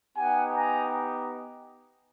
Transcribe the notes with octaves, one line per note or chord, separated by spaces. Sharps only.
B3 D#4 G4 F#5 G#5
G#5 A#5